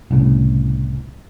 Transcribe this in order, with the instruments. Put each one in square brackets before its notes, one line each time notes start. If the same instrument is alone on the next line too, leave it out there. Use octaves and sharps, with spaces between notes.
[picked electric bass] C2 A2 C#3